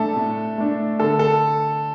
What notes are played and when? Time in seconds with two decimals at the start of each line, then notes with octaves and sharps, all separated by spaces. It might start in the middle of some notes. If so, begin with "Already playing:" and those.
Already playing: A2 A3 D4 A4
0.16 A2
0.58 A3 D4
1.00 D3 A4
1.19 A4